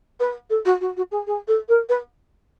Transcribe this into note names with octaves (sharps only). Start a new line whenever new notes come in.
B4
A4
F#4
F#4
F#4
G#4
G#4
A4
A#4
B4